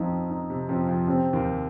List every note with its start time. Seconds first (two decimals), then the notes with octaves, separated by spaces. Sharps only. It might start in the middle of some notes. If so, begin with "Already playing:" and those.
Already playing: F2 F3 C4 D#4
0.30 D#4
0.50 C3
0.69 F2 F3 C4
0.88 F2 F3
1.08 C3 C4
1.33 D#2 D#3